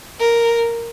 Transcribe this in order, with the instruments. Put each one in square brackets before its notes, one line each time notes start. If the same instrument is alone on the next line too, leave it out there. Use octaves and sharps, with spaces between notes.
[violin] A#4